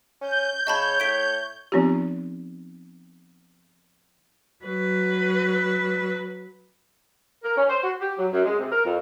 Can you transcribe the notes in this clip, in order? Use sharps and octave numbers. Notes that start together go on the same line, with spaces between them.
C#4 G6
C#3 C#5 D#5 A5 B5
A2 B6 D7
F3 B3 C4 D#4 F4 G4
F#3 B4
A#4
C#4
C5
F#4
G4
F#3
F#2
G#3
C3
A#4
F2